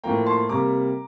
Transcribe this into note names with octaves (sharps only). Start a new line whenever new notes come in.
A2 F3 A#3 G5 A#5
A5 C6
C3 G3 A#3 A#5 D6